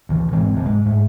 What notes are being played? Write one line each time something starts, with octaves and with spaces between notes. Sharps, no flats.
D2 E3
E1 G#2 E3 C4
F1 E2
G#2 G#3
G#2 G#3 A3